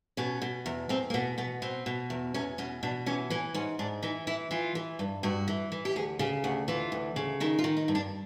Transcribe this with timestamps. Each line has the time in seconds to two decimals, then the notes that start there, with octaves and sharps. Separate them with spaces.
0.17 B2 C#4
0.42 B2
0.66 E2
0.89 E2 C4
1.10 A#3
1.14 B2 B3
1.38 B2 B3
1.62 B2 C4
1.86 B2
2.10 E2
2.34 E2 C#4
2.58 B2 C#4
2.83 B2 D4
3.06 E3 C#4
3.30 E3 C#4
3.54 G#2 C#4
3.79 G#2 D4
4.03 E3 D#4
4.27 E3 E4
4.51 E3 F4
4.75 E3
4.99 G2
5.23 G2 F#4
5.48 E3
5.72 E3
5.85 G4
5.96 D2 G#4
6.19 C#3 G4
6.44 D2 F#4
6.68 E3 F4
6.92 D2
7.16 C#3
7.40 D#3 E4
7.59 F4
7.64 D#3
7.77 D#4
7.88 G2
7.95 D4